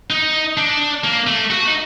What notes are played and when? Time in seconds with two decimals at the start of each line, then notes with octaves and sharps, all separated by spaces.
0.10 D#4
0.57 D4
1.04 A#3
1.27 A3
1.50 F#4
1.68 D#4